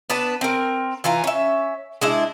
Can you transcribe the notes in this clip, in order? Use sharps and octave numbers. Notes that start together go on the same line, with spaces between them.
B3 D4 B4 A5
C4 A#4
E3 F4 G#5 A#5
C#4 E5
G#3 D4 E4